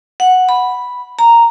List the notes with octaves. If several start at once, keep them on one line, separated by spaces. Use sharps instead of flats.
F#5
B5
A#5